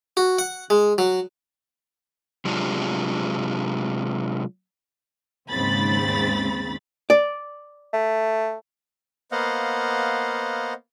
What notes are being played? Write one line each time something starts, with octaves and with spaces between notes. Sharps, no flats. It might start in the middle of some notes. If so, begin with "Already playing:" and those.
F#4
F#5
G#3
F#3
C3 F#3 G#3 D4 F4 G4
D#2 G#2 C#3 C4 B5 A6
D5
A3
A#3 B3 C5 D#5 F5 F#5